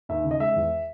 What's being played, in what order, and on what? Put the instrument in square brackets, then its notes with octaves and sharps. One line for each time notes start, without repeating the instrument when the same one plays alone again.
[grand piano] D#2 E5
C#3
D#5
G#3 E5
E2